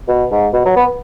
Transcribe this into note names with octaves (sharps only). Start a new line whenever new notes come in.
B2
G#2
B2
F#3
B3